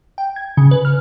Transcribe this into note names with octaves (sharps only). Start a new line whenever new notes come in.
G5
G#6
C#3
B4
F6